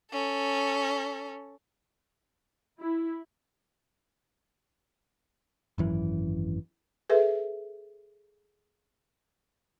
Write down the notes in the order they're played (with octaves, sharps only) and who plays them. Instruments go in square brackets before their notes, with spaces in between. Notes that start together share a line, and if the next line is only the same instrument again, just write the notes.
[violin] C#4 A4
[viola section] E4
[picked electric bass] G#1 F#2 E3
[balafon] G#4 A4 B4 E5